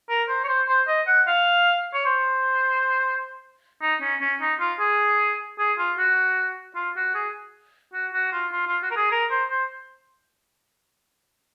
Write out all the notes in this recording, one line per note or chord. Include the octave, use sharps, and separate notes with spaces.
A#4
C5
C#5
C5
C5
D#5
F#5
F5
C#5
C5
D#4
C#4
C#4
D#4
F4
G#4
G#4
F4
F#4
F4
F#4
G#4
F#4
F#4
F4
F4
F4
F#4
A#4
G#4
A#4
C5
C5